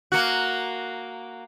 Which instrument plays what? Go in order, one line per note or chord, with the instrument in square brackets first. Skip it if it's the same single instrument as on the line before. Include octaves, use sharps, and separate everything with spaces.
[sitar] A#3 F#4